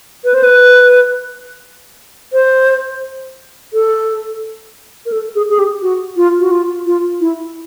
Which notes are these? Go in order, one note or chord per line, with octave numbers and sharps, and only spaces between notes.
B4
C5
B4
C5
A4
A#4
A4
G#4
G#4
G4
F#4
F4
F#4
F4
F4
E4